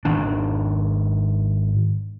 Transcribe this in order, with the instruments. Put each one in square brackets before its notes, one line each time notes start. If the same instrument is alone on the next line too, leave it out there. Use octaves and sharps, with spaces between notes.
[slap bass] G#1 D#3 D4